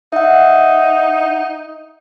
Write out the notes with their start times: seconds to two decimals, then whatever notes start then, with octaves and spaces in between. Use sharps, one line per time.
0.12 D#4 E5 F#5